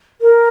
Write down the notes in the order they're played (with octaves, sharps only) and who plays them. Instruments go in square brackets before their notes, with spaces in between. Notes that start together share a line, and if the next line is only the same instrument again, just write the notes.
[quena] A#4